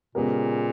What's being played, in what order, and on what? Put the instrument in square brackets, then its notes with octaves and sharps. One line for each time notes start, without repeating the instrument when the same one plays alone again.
[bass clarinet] A#2 [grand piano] C#3 G#3 B3 G4 A#4